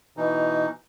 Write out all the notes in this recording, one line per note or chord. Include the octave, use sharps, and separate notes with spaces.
B2 E3 D#4